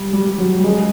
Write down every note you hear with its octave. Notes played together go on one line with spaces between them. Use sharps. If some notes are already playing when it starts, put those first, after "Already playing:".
Already playing: G3
G3
F#3
G3
G#3